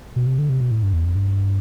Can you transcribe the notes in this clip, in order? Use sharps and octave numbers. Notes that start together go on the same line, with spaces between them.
B2
C3
D3
C3
B2
A2
G2
E2
F2
G2